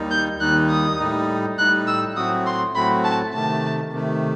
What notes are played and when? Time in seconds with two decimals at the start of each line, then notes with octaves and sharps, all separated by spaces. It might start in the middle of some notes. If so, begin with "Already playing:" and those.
Already playing: D#2 D#3 G3 D#4
0.11 G6
0.40 D#2 D#3 G3 D#4 F#6
0.70 D#6
0.99 A2 G3 D#4
1.58 A2 G3 D#4 F#6
1.87 E6
2.16 A2 F#3 A3 C4 F#4 D#6
2.46 C6
2.75 A2 F#3 A3 C4 F#4 B5
3.04 A5
3.33 C3 D#3 A3 A5
3.92 C3 D#3 A3